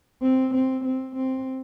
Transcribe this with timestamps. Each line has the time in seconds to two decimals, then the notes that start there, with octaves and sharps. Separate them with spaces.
0.22 C4
0.54 C4
0.84 C4
1.16 C4